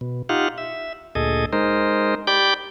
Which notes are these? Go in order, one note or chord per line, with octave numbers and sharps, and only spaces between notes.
B2
D#4 F4 G4 F5 F#5
E5
D2 A#2 G#4 A4 D#5
G#3 D#4 A#4 C5
G4 D5 G5 B5 D6 G6